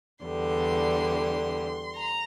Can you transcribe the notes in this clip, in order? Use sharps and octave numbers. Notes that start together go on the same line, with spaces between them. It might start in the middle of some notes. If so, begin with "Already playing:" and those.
E2 D3 G3 C6
A#5